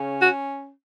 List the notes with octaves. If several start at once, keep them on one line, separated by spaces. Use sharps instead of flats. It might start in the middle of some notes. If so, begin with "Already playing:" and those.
Already playing: C#3 C#4
F#4